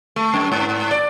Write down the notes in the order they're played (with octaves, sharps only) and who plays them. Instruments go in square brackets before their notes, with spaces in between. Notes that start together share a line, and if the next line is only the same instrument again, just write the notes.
[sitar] A3
F#2
G#2
D5